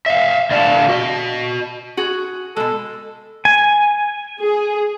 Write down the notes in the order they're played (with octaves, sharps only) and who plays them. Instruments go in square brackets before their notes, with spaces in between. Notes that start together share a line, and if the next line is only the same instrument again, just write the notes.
[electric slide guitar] E5 F5
D3 D5 F5 F#5 A5
F#4 D#5
[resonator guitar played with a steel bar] F#4 G#4
[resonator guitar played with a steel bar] B2 G#3 [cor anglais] A4
[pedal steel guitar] G#5
[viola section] G#4